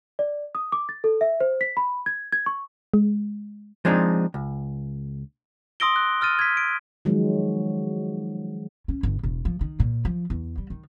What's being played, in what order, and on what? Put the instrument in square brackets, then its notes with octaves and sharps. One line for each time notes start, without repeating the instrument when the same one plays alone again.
[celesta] D5
D#6
D6
A6
A4
E5
C5
B6
B5
G#6
G#6
C#6
[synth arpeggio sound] G#3
[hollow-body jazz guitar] F3 G#3 C4 D4 D#4
C#2
[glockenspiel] C6 D#6 E6 A#6 D7 G7
F#6
E6 F6 A6 D#7
G#6 B6
D7
[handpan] D#3 F3 F#3 G#3
[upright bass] C#4
G1
E1
F3
D#3
A#2
F3
E2
G3
D#3